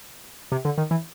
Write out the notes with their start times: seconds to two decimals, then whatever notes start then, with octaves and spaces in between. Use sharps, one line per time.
0.52 C3
0.65 D3
0.78 D#3
0.91 E3